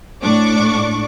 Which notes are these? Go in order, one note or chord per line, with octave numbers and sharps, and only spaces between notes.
A2 D4 C#6 D6